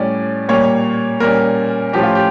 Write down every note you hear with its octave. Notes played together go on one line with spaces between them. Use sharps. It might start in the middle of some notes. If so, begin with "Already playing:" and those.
Already playing: A2 G3 C#4 D5
A#2 G3 A#3 C#5
A#2 G3 C#4 A#4
A2 F3 C#4 G4
F4
G4